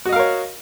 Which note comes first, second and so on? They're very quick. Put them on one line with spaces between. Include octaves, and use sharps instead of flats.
F#4 D#5 F5 A#4 C#5